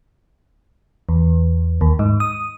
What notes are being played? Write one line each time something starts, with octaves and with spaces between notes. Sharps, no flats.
E2
D#2
G#2
D#6